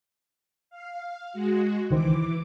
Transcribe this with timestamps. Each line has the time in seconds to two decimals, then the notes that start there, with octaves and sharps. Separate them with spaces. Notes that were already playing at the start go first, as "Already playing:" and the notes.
0.70 F5
1.33 G#3 F#4
1.90 C#2 D#3 E3 C5 D6